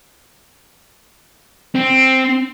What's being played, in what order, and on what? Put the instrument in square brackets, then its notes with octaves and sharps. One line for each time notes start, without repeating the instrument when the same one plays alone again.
[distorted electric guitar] C4